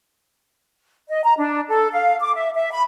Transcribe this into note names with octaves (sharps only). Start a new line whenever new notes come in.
D#5
A#5
D4
A4
F5
D6
E5
E5
B5